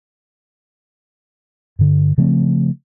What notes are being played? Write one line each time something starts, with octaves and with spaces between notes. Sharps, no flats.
G2 D3
C#3 F3 A3 C4